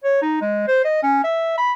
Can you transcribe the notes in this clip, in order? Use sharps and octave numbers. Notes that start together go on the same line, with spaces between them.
C#5
D#4
G#3
C5
D#5
C#4
E5
B5